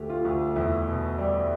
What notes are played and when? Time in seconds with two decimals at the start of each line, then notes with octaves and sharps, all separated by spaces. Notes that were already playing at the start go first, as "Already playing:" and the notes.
Already playing: D2 A3 G4
0.10 F4
0.25 D2
0.56 E2 E4
0.88 B2
1.18 G3